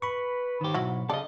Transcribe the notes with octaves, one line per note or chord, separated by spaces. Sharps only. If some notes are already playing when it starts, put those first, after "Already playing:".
B4 B5 C#6
G#2 D#3 G4
B1 F#3 E4 F#4
C#3 D4 A4 D5 D#5